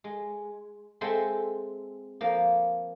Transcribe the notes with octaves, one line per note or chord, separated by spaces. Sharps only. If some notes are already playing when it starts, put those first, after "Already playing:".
G#3
G#3 C4 A4 E5 G5 C6
F3 A#3